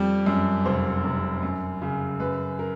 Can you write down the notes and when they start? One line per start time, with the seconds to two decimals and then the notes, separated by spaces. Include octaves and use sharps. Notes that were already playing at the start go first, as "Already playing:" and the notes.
Already playing: F2 G3
0.26 F#2
0.65 F1 C5
1.04 F1
1.43 F#2
1.82 C#3
2.20 F#2 B4
2.59 A#4